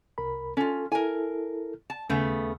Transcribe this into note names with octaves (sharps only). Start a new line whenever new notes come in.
C2 A#4 B5
C#4 F4 A4
E4 A4 A#4 G#5
A5
D#2 C#3 A3 B3